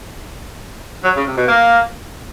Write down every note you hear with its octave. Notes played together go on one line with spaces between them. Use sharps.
F#3
C#3
C3
B2
A#3